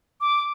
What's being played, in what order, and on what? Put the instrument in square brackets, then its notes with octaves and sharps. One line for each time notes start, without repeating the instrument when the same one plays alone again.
[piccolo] D6